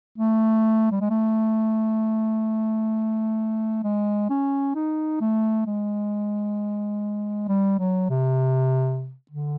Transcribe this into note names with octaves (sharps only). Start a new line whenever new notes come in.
A3
G3
G#3
A3
G#3
C#4
D#4
A3
G#3
G3
F#3
C3
D3